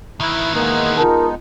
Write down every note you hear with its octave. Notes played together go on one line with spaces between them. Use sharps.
D#3 E3 E4
G#3 A#3 B3 D#4
F4 A#4 A5